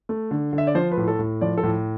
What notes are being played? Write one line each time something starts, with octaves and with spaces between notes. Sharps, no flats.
A3
D3
D3
E5
D5
F3 C5
B4
A2
A4
A2
F3 D5
A4
A2